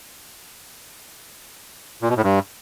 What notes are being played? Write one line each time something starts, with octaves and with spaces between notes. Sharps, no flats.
A#2
B2
A2
G2